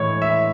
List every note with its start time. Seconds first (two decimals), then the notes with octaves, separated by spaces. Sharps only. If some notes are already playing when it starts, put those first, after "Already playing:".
Already playing: A2 E3 G#3 C#5
0.22 E5